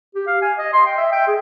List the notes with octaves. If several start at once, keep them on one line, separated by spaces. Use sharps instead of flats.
G4
F5
G#5
D#5
C6
G5
E5
G5
G#4